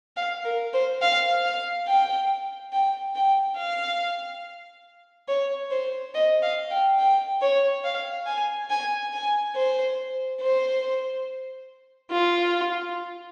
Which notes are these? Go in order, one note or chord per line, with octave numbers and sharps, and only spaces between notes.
F5
A#4
C5
F5
F5
G5
G5
G5
F5
C#5
C5
D#5
F5
G5
G5
C#5
F5
G#5
G#5
G#5
C5
C5
F4